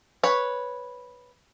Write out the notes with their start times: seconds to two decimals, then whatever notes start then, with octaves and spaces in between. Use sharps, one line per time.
0.23 B4 C#5